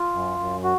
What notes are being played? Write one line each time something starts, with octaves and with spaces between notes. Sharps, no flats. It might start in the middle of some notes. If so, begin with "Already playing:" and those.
Already playing: F4
F#2
F#2
F#4